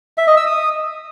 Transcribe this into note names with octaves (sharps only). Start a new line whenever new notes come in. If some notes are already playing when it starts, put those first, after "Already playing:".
E5
D#5
E6
D#6